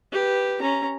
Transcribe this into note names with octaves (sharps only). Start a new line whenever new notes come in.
G4 B4
C#4 A#5